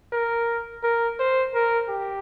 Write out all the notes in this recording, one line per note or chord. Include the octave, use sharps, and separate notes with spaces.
A#4
A#4
C5
A#4
G4